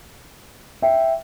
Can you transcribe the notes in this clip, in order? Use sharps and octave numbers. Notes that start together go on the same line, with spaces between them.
E5 G5